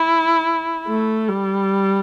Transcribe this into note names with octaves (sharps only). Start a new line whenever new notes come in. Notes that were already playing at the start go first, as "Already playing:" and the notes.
Already playing: E4
A3
G3